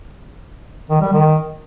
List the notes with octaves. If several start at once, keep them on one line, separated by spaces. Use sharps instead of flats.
D#3
G3
D#3